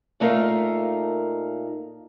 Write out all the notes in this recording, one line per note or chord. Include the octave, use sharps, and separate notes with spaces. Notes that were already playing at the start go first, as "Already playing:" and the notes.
A#2 A3 D#4 A#4 F5